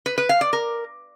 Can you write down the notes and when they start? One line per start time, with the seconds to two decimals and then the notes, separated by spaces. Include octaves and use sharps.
0.06 B4
0.18 B4
0.29 F5
0.41 D5
0.53 A#4